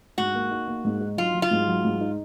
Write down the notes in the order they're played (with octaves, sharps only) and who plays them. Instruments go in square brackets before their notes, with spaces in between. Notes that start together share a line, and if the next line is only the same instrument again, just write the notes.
[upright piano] G#2 [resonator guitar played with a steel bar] F#4
[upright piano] A#3
D#4
A#3
G#2
D#4
[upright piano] F#3 [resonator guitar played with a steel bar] F4
[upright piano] F#3
[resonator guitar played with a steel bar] F4
[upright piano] G#2
F#3
G#2
D#4